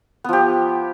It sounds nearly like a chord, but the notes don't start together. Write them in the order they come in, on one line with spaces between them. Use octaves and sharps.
B3 F3 G4